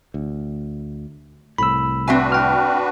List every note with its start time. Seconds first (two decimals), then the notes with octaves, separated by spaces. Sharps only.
0.14 D2
1.58 C2 A2 B5 E6
2.08 C4 D4 F#4 B4 E5 G#5
2.32 G5 F6